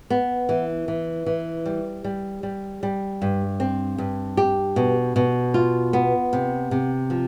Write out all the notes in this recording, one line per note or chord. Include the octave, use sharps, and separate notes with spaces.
B3
E3
E3
E3
G3
G3
G3
G3
G2
C4
G2
G4
B2
B2
F4
B3
C3
C3
F3